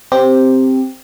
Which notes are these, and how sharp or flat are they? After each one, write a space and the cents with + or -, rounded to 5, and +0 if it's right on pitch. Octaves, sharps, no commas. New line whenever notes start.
C4 +0 G4 +0